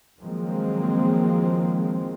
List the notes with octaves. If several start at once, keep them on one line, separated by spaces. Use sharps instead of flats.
D#3 F3 F#3 G#3 A#3 C4